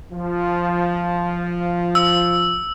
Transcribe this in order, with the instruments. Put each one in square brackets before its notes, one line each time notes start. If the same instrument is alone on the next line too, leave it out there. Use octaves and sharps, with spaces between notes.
[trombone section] F3
[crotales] E6